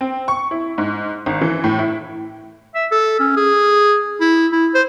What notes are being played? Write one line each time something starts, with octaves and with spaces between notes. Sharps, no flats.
C4
C#6
E4
G#2
G#1
E3
A2
E4
E5
A4
C#4
G#4
E4
E4
C5